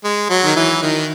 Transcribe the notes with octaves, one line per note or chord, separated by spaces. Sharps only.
G#3
F#3
D#3
E3
D#3